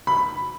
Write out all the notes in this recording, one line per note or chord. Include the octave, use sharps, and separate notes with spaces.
B5